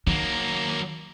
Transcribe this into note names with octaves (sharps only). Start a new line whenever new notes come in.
D#3 F#3 A#3